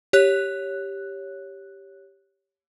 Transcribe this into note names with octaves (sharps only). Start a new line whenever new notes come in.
G4 C#5 F#6